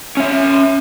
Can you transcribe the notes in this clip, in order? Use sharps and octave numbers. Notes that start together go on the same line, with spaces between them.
C#4 E5